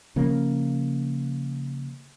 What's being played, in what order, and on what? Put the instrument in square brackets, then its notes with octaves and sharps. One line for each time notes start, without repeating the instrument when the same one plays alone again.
[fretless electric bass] C#3 F3 A#3